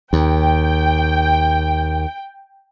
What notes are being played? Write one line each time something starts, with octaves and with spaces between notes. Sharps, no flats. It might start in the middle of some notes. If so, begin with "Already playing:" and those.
D#2 G5